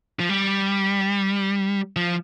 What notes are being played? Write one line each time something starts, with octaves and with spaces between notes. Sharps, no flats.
F3
G3
F3